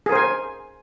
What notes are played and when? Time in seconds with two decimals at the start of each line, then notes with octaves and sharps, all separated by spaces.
0.06 G#4
0.09 A#4
0.12 C5
0.15 G#5